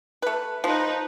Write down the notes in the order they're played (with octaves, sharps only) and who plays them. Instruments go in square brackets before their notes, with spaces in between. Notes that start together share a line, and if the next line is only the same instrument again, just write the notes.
[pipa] A3 B4
[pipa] F3 [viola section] D#4 B4